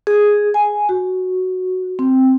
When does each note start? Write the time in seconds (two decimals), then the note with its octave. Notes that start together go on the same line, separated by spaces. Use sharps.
0.07 G#4
0.54 G#5
0.89 F#4
1.99 C4